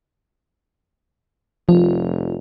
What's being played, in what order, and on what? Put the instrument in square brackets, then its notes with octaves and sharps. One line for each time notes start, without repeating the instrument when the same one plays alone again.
[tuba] F1 [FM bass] F3 [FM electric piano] F4